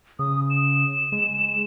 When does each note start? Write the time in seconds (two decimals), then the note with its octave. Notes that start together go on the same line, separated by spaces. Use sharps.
0.19 C#3 D#6
0.50 E7
1.12 G#3